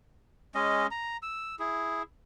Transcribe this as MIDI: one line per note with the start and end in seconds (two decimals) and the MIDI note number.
0.55 0.87 56
0.55 0.87 61
0.55 0.87 75
0.91 1.17 82
1.23 1.55 88
1.59 2.02 64
1.59 2.02 68